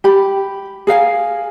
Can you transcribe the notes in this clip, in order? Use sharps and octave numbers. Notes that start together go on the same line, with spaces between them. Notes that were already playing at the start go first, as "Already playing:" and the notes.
G4 B5
G#4 A#4 F5 G#5